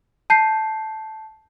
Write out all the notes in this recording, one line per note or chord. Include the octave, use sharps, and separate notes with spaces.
A5 G6 C7